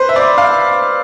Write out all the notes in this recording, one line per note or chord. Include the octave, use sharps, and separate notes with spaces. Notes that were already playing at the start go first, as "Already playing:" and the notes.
Already playing: B4 C5
E5
D5
F5